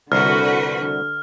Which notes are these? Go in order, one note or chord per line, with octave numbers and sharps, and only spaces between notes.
C2 D3 F#4 B4 F6